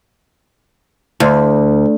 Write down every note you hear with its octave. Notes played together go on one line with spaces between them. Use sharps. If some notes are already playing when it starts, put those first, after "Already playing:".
D2